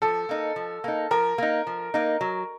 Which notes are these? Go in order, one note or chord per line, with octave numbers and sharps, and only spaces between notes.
F3 A4
A#3 D#4
F3
A#3 D#4
F3 A#4
A#3 D#4
F3
A#3 D#4
F#3